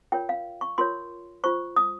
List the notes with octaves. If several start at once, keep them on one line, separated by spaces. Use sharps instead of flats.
F4 A#4 C#5 G5
F5
C#6
F4 A#4 C#5 C6
F4 C5 C#6
D#6